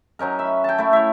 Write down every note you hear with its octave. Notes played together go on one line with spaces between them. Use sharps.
F#3 C#4 D#4 A#4
E5 B5
G5 A5
A3 E4
C#5 E5